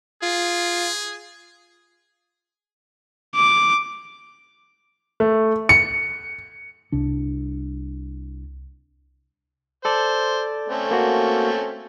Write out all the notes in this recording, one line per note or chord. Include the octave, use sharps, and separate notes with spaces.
F4 G#4
D6
A3
C#7
C2 D4
A4 C5 D5
A3 C4 C#4
A#3 F#4